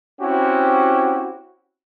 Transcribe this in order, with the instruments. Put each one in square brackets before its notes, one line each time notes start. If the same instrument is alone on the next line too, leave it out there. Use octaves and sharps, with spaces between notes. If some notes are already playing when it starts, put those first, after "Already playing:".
[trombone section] C4 C#4 E4 F#4 G4